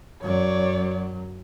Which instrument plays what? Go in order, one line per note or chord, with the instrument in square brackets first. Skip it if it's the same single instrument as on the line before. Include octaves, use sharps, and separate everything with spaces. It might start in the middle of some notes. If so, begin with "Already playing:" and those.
[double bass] F#2 F#3 [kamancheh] C#5 D5